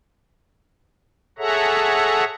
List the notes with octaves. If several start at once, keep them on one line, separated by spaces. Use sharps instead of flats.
G#4 A4 C#5 E5 F#5 A#5